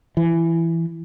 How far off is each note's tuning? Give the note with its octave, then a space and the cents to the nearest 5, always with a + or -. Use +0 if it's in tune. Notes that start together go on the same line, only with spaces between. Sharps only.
E3 +10